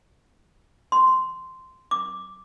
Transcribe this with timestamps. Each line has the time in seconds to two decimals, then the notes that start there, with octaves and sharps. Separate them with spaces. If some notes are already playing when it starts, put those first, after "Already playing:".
0.92 C6
1.91 D6